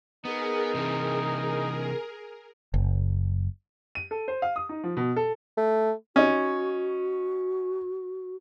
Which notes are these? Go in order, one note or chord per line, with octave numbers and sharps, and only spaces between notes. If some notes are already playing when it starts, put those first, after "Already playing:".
B3 D#4 G#4 A#4
C3 E3
F#1
D#7
A4
C5
F5
D#6
D#4
F3
B2
A4
A3
C#4 D#4 F#4